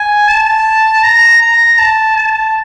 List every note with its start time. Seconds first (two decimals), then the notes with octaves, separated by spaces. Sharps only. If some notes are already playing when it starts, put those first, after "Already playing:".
Already playing: G#5
0.28 A5
1.03 A#5
1.42 A#5
1.79 A5
2.16 A5